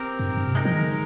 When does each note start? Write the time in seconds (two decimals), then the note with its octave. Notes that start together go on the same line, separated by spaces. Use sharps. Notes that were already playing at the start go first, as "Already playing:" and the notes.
Already playing: C4 G4 A#4
0.20 G2
0.29 G#2
0.37 G2
0.47 C3
0.55 G#3 D#4 A#4
0.65 F3
0.74 D#3
0.82 D3